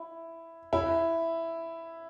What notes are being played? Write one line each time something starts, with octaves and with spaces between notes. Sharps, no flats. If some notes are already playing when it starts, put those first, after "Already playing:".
Already playing: E4
E4